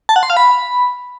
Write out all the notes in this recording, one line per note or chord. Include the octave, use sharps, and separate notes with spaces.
A5
F#5
C6
F5
B5